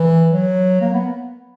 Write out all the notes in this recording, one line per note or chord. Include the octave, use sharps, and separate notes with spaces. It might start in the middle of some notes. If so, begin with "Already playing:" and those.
Already playing: E3
F#3
A#3
B3